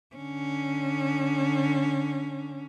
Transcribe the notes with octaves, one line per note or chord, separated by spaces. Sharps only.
D3 C#4